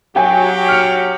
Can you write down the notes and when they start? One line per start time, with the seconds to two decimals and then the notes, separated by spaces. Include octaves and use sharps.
0.16 F#3 G4 G5 G#5
0.68 F6 C#7 F7